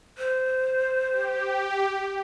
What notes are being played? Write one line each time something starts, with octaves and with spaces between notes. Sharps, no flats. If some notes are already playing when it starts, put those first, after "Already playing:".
C5
G4